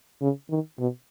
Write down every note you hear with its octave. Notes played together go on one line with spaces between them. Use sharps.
C#3
D#3
B2